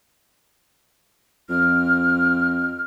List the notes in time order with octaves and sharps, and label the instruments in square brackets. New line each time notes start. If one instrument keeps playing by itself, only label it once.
[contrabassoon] F2 [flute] F6